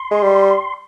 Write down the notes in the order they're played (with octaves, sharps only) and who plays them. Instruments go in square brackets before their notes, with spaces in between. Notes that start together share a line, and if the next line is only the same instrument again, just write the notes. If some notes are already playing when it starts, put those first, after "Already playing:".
Already playing: [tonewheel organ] C6
[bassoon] G#3
G3